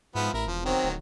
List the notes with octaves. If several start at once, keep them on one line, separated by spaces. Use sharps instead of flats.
G#2 F3 B3 E4
A1 E4 A#4
E1 F3
D#3 F#3 C4
D1